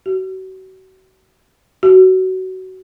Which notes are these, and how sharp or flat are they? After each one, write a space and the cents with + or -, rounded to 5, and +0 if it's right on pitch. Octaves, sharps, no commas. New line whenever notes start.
F#4 +35
F#4 +20